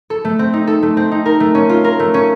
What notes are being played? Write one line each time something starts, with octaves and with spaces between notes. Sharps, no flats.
A4
A3
C4
D#4
A4
A3
C4
D#4
A#4
A3
C#4
F4
A#4
A3
C#4